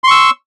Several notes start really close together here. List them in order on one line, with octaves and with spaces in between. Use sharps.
C6 C#6 E6